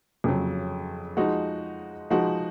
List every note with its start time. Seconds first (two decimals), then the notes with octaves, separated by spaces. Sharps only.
0.24 F2 C#3 F#3
1.17 F3 G#3 D#4 F#4
2.10 F3 G#3 D#4 F#4